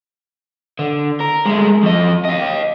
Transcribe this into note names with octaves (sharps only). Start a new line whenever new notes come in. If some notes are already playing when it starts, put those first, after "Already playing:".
D3
A#4
G#3 A3
F2 D#5
D#5 F5